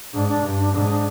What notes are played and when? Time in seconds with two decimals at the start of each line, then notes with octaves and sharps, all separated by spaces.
0.13 G#2 D4
0.28 D4
0.43 G2
0.59 D4
0.73 G#2 D4
0.90 D4